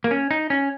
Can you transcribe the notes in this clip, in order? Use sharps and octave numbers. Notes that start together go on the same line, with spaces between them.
A#3
C#4
D#4
C#4